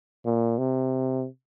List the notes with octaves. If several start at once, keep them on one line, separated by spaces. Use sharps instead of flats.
A#2
C3